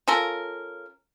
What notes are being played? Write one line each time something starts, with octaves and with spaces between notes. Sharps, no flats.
C#4 F4 A4 A#4